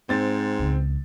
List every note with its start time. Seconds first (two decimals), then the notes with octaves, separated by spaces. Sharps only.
0.09 G#2 C4 A6
0.59 C#2 E3